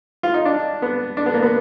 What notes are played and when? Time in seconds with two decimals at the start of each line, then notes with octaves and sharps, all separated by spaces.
0.23 F4
0.34 D#4
0.45 D4
0.82 B3
1.17 D4
1.26 B3
1.34 A#3
1.42 B3